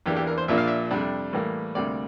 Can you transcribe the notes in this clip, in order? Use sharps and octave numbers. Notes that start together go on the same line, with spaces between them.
E2 E3 A#3 D4 G4
G4
A#4
C5
A#1 A#2 F3 A#3 D4 E5
F5
E5
F2 C3 G3 D4
A2 E3 G3 A#3
D2 C3 G3 A#3 D5